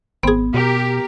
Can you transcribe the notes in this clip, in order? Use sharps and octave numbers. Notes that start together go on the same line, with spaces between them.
G#1 B3 C4 G#4
B2 G4 A#4